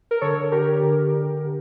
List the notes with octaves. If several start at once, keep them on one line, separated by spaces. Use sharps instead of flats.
A#4
D3 A4 C#5
D3 G4 A#4
D3
D3
D3